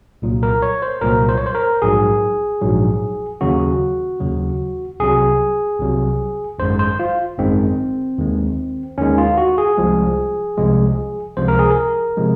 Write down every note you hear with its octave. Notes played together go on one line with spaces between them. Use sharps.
C2 A#2 F#3
A#4
C#5
C5
C2 A#2 F#3 A#4
C5
C#5
C5
A#4
A#1 G#2 F#3 G#4
A#1 G#2 F#3
D#2 C#3 F#3 F#4
D#2 C#3 F#3
C2 C3 F#3 G#4
C2 C3 F#3
G#1 F#2 D#3 G#3 C5
C5
F4
G#1 F#2 D#3 G#3 C4
D#2 D#3 G#3
D#2 D#3 G#3 C#4
F4
F#4
G#4
C2 C3 F3 G#3
C2 C3 F3 G#3
C#2 C3 F3 G#3 C5
A#4
G#4
A#4
C3 F3 G#3